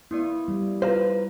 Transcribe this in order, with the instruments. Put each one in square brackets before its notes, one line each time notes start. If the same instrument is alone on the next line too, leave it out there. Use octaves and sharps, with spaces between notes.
[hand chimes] A#3 B3 D5 [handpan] E4
[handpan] G3
[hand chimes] F4 [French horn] B4 [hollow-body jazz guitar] C5 F5 A#5